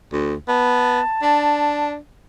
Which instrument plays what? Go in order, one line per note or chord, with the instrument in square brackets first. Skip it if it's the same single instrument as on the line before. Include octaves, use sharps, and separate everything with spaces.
[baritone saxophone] D2
[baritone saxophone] B3 [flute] A5
[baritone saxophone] D4